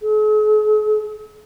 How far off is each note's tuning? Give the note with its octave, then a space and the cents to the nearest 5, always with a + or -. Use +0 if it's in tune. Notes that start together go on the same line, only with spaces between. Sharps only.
G#4 +45